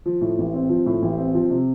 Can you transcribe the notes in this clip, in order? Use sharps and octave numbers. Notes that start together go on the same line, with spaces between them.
F3
A2
A1
C4
F3
A2
A1
C4
F3
C3